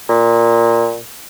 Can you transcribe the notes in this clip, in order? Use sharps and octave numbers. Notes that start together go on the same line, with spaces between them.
A#2